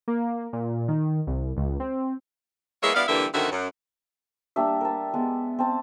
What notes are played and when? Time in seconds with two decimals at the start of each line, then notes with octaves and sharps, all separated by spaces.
0.08 A#3
0.53 A#2
0.88 D#3
1.27 C2
1.57 C#2
1.80 C4
2.82 E3 G#3 A#3 B3 C#5 E5
2.95 G3 B3 D4 E4 F5
3.09 G2 D3 E3 G3 A#3 E5
3.33 F#2 D3 D#3 C4 F#4 E5
3.51 F#2
4.56 G3 A#3 D4 E5
4.81 A#4 A5
5.14 G#3 B3
5.59 C4 A5